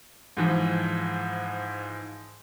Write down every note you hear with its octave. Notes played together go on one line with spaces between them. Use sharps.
G#2 E3 F3